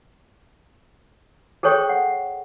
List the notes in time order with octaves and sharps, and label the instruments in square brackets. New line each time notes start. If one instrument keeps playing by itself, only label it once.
[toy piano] G#4 A4 C5 C#5 G5 C#6
F#5